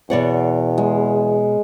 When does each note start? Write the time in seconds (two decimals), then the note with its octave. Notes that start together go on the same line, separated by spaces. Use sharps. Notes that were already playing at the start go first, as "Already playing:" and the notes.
0.10 E2 B2 C#5 D5 F#5
0.78 G#3